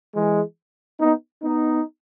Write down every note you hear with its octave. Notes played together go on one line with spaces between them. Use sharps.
E3 G#3
B3 D#4
B3 D#4